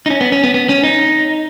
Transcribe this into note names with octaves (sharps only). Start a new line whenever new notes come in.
D#4
C#4
B3
C#4
B3
B3
C#4
D#4